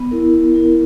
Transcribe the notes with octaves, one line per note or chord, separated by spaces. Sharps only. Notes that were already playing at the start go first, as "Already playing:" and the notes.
Already playing: B3
E4 A#4
B3
E4 A#4